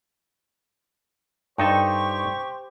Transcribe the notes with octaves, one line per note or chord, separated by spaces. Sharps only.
G2 D#4 G4 A4 C5 G5 C#6